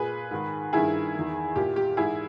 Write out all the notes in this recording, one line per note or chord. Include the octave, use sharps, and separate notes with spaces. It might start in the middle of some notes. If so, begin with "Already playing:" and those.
Already playing: A#2 G#4 B4
G#2 D#3
G2 D#3 E4 G#4
E2 D#3
A#2 G4
G4
G#2 E3 E4 G#4